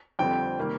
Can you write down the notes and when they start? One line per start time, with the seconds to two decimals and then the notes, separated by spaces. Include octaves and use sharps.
0.19 F2 D3 G3 C4 G5
0.59 C3 D#3 G3 A#3